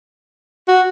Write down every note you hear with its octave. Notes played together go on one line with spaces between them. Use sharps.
F#4